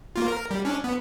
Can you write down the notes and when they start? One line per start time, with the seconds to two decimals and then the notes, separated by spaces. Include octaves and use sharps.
0.16 A#3 F4
0.28 A#4
0.51 G3
0.65 C#4 D4
0.84 B3